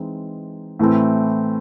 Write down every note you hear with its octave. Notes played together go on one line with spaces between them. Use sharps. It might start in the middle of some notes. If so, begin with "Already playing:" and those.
Already playing: E3 G#3 C4 D#4
A2 E3 A3 C4